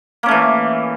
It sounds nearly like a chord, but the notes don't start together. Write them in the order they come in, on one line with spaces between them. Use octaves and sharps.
A#3 C#4 A3 E3